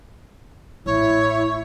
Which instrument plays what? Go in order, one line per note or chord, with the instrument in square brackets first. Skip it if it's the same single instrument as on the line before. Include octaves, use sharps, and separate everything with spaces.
[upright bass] A1 [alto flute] E4 [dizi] C#5